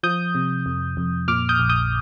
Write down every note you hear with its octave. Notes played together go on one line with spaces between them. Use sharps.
F3 D#6 G6
C3
F2
F2
A#2 D6 F6
D#6 G6
A#1
D#6 G6